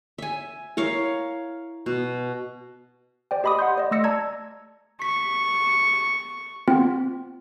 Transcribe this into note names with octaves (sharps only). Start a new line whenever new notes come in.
E5 G#5
E4 A#4 C#5 F5
B2
C5 D5 G5
G4 D#5 B5 D6 D#6
F#5 C6 G6
D5 D#5
A3 C6 E6 A#6 C#7
D5 A5 A#5 E6 G#6
C#6 B6
B3 C4 F4